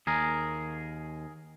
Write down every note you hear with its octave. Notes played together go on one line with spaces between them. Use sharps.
D#2 G#4 A#4